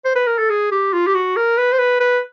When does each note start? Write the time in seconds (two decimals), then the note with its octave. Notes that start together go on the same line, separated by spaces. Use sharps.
0.05 C5
0.15 B4
0.27 A#4
0.39 A4
0.50 G#4
0.72 G4
0.93 F4
1.07 G4
1.14 F#4
1.36 A#4
1.58 B4
1.73 C5
1.79 B4
2.00 B4